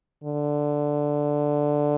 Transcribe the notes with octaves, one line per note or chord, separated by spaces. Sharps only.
D3